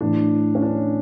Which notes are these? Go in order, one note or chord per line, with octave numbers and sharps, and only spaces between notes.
A2 E3 D4
C#4
D4